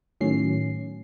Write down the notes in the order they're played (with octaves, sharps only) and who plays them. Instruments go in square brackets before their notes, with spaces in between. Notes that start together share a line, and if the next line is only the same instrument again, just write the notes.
[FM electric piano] A2 D#3 F#3 C#4 C7